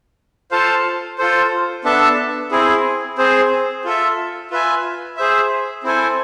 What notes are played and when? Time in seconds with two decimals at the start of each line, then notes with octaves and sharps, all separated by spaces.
0.51 F4 A4 C5 F5 A5
1.18 F4 A4 C5
1.84 B3 D4 A4 E5 A5
2.52 C4 E4 G#4
3.18 C4 G#4 C5
3.85 F4 A4 E5
4.50 F4 B4 E5 G#5
5.17 G#4 C5 E5
5.83 C4 E4 A4 C5 G#5